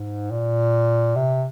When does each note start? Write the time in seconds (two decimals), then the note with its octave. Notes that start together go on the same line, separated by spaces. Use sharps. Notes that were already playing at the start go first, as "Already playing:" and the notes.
Already playing: G#2
0.31 A#2
1.16 C3